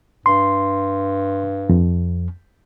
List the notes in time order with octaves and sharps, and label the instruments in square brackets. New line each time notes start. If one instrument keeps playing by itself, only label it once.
[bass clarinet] G2 [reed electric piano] C6
[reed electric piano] F2